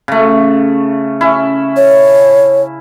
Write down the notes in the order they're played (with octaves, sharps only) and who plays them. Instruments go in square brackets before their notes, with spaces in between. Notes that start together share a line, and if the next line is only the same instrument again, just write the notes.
[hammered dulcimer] C#3 A3
C#4 E4
[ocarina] C#5